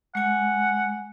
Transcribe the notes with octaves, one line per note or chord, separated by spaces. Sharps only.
G#3 F#5 G#5